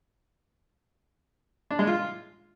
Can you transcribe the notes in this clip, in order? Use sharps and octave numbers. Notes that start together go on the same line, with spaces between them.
D4
G#3
F4